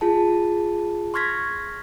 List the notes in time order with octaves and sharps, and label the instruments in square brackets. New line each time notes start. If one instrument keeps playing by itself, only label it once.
[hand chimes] F4 G#4 A5
C6 C#6 F6 G#6 A#6 B6